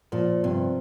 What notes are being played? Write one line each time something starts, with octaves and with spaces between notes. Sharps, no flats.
A#2 F3
G2 C3